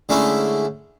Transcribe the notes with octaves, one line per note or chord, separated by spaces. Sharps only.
D3 G#3 A3 C#4 E4